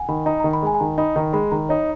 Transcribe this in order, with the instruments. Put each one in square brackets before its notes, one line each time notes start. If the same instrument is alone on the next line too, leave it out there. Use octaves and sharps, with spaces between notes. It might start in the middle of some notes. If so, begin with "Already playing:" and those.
Already playing: [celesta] F#5 G#5
[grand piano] D#3 [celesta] B5
[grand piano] D#4 [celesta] A#5
[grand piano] D#3 [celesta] A#5
[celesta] B5
[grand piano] G#3 [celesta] G#5
[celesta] G#5
[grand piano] D#3 [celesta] A#5
[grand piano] D#4 [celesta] B5
[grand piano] D#3 [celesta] A#5
[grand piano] G#3 [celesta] B5
[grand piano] D#3 [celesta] A#5
[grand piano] D#4 [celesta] C#5